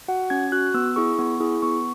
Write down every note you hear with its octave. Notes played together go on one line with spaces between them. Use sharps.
F#4 F#5
C#4 G#6
F#4 F#6
B3 E6
E4 G#4 C#6
B3
E4 G#4
B3 C#6